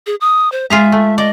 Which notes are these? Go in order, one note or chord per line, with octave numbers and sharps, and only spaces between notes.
G#4
D#6
C5
G#3 F4 G#4 E5 A#5
A3
D5 D#5